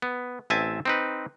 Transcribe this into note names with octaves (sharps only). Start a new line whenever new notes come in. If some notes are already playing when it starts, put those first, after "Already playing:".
B3
A1 C4 E5 G#5 A5
C4 D#4 B4